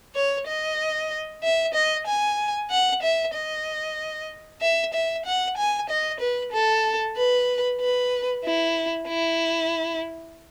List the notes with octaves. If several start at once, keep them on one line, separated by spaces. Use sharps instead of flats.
C#5
D#5
E5
D#5
G#5
F#5
E5
D#5
E5
E5
F#5
G#5
D#5
B4
A4
B4
B4
E4
E4